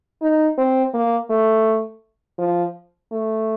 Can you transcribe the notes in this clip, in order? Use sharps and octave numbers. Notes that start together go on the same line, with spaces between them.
D#4
C4
A#3
A3
F3
A3